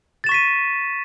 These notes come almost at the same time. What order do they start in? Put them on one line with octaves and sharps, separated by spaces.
A6 E7 C#6 B6 D#7